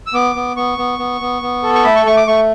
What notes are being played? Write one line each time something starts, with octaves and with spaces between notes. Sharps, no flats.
E6
B3 D6
B3
B3 C#6
B3
B3
B3
B3
A4
C#6
A3 B5
C#6
A3 C#6
D6
A3 C#6